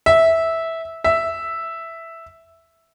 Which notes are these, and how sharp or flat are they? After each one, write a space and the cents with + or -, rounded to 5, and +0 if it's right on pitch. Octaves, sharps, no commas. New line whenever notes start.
E5 -10
E5 +0